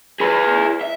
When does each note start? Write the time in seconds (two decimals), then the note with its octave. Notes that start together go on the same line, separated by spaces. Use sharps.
0.20 G#4 B4
0.81 E5